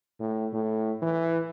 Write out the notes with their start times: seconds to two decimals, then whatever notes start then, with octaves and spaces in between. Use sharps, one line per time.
0.20 A2
0.53 A2
1.02 E3